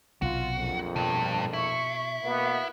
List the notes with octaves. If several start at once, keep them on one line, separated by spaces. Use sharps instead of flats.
B1 C3 F4 F#4
A#1 F2
G2 B2
E4 C#6
B2 A#3 B3